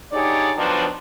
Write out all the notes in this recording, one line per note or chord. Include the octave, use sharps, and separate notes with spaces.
D3 D#4 G4 G#4 C#5 D5
D#3 F3 F#3 B3 D4